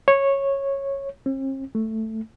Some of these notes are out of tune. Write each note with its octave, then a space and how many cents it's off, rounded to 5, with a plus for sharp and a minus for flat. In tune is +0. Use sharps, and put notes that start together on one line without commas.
C#5 -10
C4 +45
A3 +5